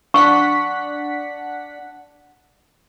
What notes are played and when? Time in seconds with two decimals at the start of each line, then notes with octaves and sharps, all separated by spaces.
0.14 D4 F#5 C#6 B6